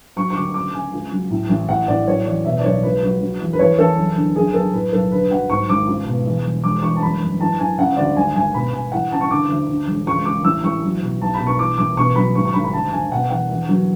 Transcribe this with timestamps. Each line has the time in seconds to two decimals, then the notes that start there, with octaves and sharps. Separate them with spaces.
0.16 F#3 C#6
0.30 C#6
0.36 D2 D6
0.54 C#3 D6
0.74 C#3 G#5
0.93 C#2
1.12 F#3
1.31 A2
1.49 A1
1.68 A2 F#5
1.88 A2 D5
2.06 F#3 C#5
2.26 E2 D5
2.45 B2 E5
2.59 D5
2.64 B1 C#5
2.83 C#2 B4
3.03 F#3
3.21 F#3
3.40 E2
3.53 B4
3.59 E2 C#5
3.79 E2 A4
3.97 F#1
4.16 D3
4.35 F#2 G#4
4.54 F#2 A4
4.73 A2 B4
4.92 B1 A4
5.11 D3 B4
5.31 F#3 F#5
5.50 G#2 C#6
5.69 G#1 D6
5.87 C#2
6.06 B2
6.26 E2
6.45 E1
6.64 E1 D6
6.83 E2 C#6
6.96 A5
7.02 F#2 B5
7.22 F#2
7.40 E3 A5
7.59 E3 G#5
7.78 C#3 F#5
7.97 D2 D5
8.16 G#1 G#5
8.36 G#1 G#5
8.54 B2 B5
8.73 B2 G#5
8.92 E3 F#5
9.12 C#3 A5
9.21 C#6
9.31 D3 D6
9.50 D2
9.68 D3
9.87 E1
10.06 C#2 C#6
10.25 C#3 D6
10.44 A1 E6
10.64 A1 C#6
10.83 F#3
11.02 B2
11.21 B1 A5
11.34 B5
11.39 B2
11.47 C#6
11.59 E3 D6
11.78 A1 D6
11.97 B2 C#6
12.16 F#3 B5
12.35 G#1 C#6
12.45 C#6
12.54 G#1 B5
12.64 B5
12.73 D2 A5
12.92 D2 G#5
13.11 B2 F#5
13.30 E2 F#5
13.50 E2
13.69 F#3